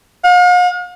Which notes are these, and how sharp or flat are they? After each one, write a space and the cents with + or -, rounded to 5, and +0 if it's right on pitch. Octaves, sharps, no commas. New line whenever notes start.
F5 +45